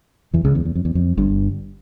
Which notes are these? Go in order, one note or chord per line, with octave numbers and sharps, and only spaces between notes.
E2 E3
C#2 C#3
E2
E2
F2
E2
F2
G1 G2